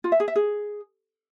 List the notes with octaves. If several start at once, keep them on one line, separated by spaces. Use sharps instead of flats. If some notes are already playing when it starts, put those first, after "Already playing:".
F4
E5
G#4
E5
G#4